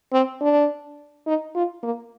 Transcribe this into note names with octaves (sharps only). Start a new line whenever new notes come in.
C4
D4
D#4
F4
A#3